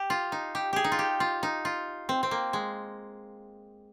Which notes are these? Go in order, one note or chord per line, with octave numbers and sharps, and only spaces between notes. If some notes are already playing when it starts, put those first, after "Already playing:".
Already playing: G4
F4
D#4
G4
G4 G#4
D#4
F4
G4
F4
D#4
F4
C4
C4
A#3
G#3